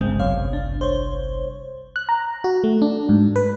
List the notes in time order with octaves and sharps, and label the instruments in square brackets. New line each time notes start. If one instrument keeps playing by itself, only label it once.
[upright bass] G1 C2 [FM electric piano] C#3 G#3 C4
[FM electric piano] F#2 C#5 F5
D4
C5 C#5
F#6
A#5
F#4
A3
D4
G#2
B4